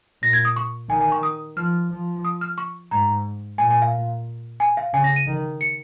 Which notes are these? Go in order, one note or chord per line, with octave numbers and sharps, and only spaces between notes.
A#2 A#6
G#6
D#6
C#6
D#3 G#5
G#5
C#6
D#6
F3 F6
F3
D#6
F6
C#6
G#2 A#5
A#2 G#5
G#5
F5
G#5
F5
C#3 G#5
A#6
D#7
D#3
C#7